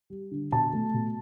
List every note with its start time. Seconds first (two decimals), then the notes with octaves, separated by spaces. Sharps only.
0.10 G3
0.31 D3
0.52 B2 A5
0.73 A3
0.94 B2